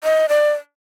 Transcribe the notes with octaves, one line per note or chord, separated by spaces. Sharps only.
D#5
D5